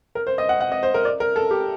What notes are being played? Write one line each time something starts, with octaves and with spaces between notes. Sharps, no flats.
A#4
C5
D#5
F#5
F#5
D#5
C5
A#4
D5
A#4
A4
G4